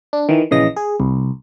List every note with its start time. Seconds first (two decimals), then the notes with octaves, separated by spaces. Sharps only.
0.13 D4
0.29 D#3 E3
0.51 A#1 C#3 E3 D#5 A#6
0.76 G#4
1.00 C2